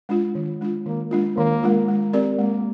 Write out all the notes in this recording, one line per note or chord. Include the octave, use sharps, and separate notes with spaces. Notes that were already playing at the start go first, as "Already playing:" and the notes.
G#3 D4 F4
D#3
G#3 D4 F4
D#3 A#3
G#3 D4 F4
D#3 A#3
G#3 D4 F4
G#3
C4 G4 A#4 D5
G#3 A#3